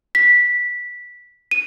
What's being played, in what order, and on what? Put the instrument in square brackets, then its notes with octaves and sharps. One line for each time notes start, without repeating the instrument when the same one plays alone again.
[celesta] B6
D#7